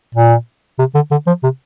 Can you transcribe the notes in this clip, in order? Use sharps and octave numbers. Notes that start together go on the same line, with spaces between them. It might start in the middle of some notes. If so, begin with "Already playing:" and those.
A#2
C3
D3
D3
F3
C3